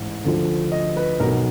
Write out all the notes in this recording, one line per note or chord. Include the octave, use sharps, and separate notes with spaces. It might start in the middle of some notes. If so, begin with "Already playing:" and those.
Already playing: A1 G#2 E3
D2 D3 F3
D#5
B4
B1 B2 A#4